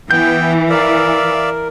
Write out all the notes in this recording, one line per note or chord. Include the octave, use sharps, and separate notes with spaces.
E3 B3 G5 G6
A#4 D5 E5 F5